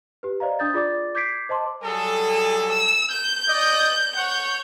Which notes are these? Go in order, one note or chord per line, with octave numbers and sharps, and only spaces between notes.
G4 B4
C5 D5 D#5 F5 A#5
D4 D#6 G6 A6
F4 G#4 D5 D6 A6
D6 G6 G#6 B6 C7 D7
C5 D#5 A5 C6 D6
F#3 G3 G#4 A4
E6
G6
D5 D#5
C#5 F#5 G6